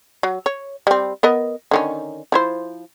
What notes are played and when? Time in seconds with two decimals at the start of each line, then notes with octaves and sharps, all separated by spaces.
0.23 F#3
0.46 C#5
0.87 G3 C4
1.23 B3 A#4 D#5
1.71 D3 D#3 C#4
2.32 F3 E4 C5